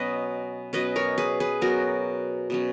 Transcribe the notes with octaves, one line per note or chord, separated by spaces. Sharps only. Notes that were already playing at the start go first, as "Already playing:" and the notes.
Already playing: B2 F#3 C#4 B4 D#5
B2 F#3 C#4 B4 D#5
A#4 C#5
G#4 B4
G#4 B4
B2 F#3 C#4 F#4 A#4
B2 F#3 C#4